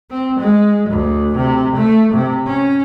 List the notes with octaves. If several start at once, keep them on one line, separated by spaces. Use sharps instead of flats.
C4
G#3
D2
C3
A3
C3
C#4